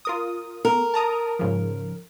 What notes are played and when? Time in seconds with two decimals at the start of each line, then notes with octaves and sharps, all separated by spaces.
0.05 F4 A#4 D#6
0.65 B3 A#4
0.94 A5 A#5 D#6
1.39 G#2 C#3 F3